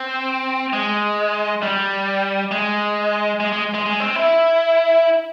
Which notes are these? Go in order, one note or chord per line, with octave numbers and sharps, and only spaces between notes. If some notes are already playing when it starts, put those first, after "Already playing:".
Already playing: C4
G#3
G3
G#3
G#3
G#3
G#3
G#3
C4
E4